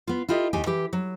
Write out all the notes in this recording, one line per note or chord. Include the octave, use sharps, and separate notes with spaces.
B3 F4
E4 F4 G4 A4 D#5
D#2 G4 G5 G#5
E3 G4
F#3